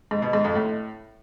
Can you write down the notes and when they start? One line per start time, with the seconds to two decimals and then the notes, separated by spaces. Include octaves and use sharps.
0.11 G#2
0.22 B2
0.33 G#2
0.44 F2
0.56 A2